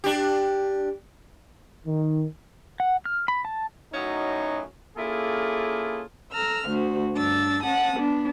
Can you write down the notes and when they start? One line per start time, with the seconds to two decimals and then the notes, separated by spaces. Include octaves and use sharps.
0.04 D4 G4
1.86 D#3
2.80 F#5
3.05 F6
3.28 B5
3.45 A5
3.92 F#2 A2 F#3 C#4 D#4
4.97 A#3 C#4 E4 F4 G#4 A4
6.32 A4 A#5 E6 F6
6.70 D2 F#4 C5
7.14 G2 D4 E6 A6
7.63 C#4 F#5 A5 D#6
7.97 B3 D4